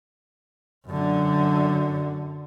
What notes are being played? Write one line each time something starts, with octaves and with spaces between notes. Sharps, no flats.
F#2 D3